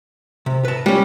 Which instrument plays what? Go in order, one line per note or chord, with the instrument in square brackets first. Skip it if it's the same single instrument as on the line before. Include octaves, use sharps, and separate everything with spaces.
[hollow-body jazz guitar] C3
B4 A5
[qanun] G3 C#4 [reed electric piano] G#3